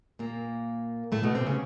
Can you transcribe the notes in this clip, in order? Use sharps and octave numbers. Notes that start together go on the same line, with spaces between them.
A#2 A#3
A2 A3
B2 B3
C3 C4
C#3 C#4